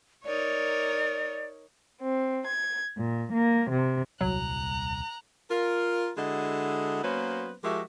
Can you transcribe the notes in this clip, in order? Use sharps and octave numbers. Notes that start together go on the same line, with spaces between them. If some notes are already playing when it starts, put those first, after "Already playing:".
D#4 A#4 C#5 D5
C4
G#6
A#2
A#3
C3
D#1 C2 F#3 A#5 F#6
F4 A#4
D3 G#3 E4 F#4 A4 D#5
F#3 A#3 B3 C#4 B4 C5
F3 G#3 F#4 G4 A#4 E5